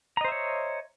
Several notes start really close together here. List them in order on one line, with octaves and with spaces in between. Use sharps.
A#5 D#5 C5 E5 C#5